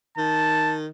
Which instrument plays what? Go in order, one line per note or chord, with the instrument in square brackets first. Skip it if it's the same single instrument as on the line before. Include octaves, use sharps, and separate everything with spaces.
[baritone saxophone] D#3 [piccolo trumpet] A5